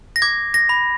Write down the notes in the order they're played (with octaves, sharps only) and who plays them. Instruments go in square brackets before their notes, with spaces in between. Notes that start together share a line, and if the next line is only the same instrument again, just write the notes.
[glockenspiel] A#6
D6 G#6
A#6
B5